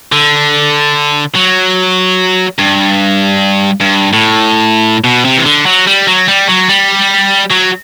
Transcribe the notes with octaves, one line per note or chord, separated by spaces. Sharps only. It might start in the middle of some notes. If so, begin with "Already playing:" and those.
D3
F#3
G2
G2
A2
B2
C3
E3
D3
F#3
G3
F#3
G3
F#3
G3
F#3